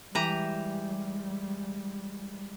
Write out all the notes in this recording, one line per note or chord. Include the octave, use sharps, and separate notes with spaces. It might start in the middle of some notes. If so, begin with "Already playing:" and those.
E3 G3 G#3 G4 A#5